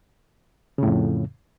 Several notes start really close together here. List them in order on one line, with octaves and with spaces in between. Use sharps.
C#3 A2 F2